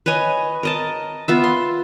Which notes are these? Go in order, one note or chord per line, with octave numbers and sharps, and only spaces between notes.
B4 C#5 D#5 G#5
A#4 D#5 A5
B3 F4 E5
C6